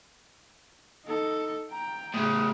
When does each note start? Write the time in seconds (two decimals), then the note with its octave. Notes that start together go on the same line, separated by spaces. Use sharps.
1.06 D#4 A4
1.72 G5 A#5
2.14 A2 C#3 D#6